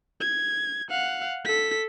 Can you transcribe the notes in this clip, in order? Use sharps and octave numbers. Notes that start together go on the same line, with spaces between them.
G#6
F5 F#5
A4 B6